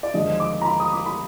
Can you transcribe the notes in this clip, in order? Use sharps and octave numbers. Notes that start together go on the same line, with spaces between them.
D5
D#2 D3 F3 G#3 D#5
D6
A#5
B5
D#6
D6
B5